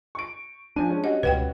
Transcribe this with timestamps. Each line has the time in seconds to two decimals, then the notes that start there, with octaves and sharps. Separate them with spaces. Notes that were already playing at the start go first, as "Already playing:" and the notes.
0.15 C#6 D7
0.76 F3 D4 G#5 D#7
0.89 G#3 C#4
1.04 G3 C#4 F#4 D#5
1.23 C#2 B2 B4 F#5 G5